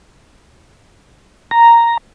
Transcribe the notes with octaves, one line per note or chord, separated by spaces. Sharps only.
A#5